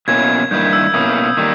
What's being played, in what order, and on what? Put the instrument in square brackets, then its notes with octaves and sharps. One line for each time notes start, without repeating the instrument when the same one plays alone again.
[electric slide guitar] B2 A#3 C#4 E4 [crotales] G#6
[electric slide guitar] G2 D#3 A#3 E4 [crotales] G6
[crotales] E6
[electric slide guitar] B2 A#3 C#4 E4 [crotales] D#6
[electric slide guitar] D#3 G3 A#3